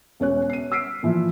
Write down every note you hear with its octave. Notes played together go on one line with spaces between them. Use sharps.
E1 C#4 C#5 F#6
C7 D#7
E6 F6 B6 C7 D7
A#2 E3 F3